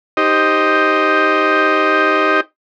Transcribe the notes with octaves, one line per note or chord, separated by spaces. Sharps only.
D#4 G4 C5 D#5